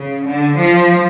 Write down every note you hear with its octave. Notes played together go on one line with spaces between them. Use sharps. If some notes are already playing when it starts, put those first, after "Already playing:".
Already playing: C#3
D3
F3